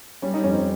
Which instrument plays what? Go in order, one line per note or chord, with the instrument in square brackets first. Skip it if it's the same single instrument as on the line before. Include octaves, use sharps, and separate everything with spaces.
[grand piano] G3 [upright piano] C#4
[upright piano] D#4
[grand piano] F2 [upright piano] C#4
[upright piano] C4